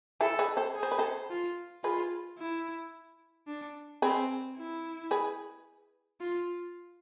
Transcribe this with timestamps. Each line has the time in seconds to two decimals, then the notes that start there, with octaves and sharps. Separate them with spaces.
0.21 E4 G#4 A4
0.39 G#4 B4
0.57 A4 C5
0.75 G#4
0.83 C5
0.92 B4
0.99 A4 C5
1.30 F4
1.84 F4 G#4 B4
2.38 E4
3.47 D4
4.02 C4 G#4 B4
4.57 E4
5.11 G#4 B4
6.21 F4